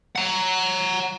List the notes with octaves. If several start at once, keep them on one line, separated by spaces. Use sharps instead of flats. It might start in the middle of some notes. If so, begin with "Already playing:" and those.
F#5 A#5